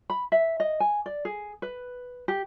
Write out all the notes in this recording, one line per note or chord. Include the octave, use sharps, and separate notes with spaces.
B5
E5
D#5
G#5
D5
G#4
B4
G4